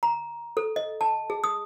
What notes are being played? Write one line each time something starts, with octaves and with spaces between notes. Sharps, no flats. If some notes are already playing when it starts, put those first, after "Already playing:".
A#5
A4
D#5
A5
G#4
D#6